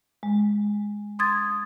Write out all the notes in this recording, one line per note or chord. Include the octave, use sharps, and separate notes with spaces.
G#3
C6 D#6 G#6 A6